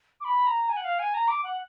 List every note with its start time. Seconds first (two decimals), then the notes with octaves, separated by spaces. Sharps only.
0.21 D6
0.24 B5
0.47 A#5
0.69 G#5
0.77 F#5
0.84 F5
0.99 G#5
1.14 A#5
1.28 D6
1.44 F#5